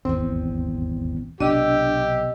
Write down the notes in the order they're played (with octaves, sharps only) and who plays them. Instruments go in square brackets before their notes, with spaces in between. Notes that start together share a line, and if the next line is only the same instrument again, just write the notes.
[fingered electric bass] D#1 G#1 E2 [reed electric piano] C4
[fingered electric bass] B1 C3 [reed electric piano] D4 [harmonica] G4 [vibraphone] D#5 E6